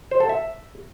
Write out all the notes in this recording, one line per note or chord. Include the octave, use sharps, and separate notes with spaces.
C5
A4
E5